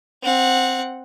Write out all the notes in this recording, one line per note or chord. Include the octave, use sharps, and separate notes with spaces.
C4 F#5